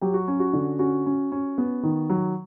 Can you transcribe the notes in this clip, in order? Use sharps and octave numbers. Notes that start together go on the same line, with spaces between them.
F#3 G4
F#4
C#4
F#4
D3
C#4 F#4
C#4
C#4
B3
D#3
F#3